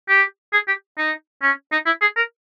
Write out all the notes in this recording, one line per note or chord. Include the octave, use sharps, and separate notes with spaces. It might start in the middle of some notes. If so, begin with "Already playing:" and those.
G4
G#4
G4
D#4
C#4
D#4
E4
G#4
A#4